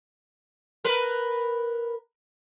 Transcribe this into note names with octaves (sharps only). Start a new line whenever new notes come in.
A#4 B4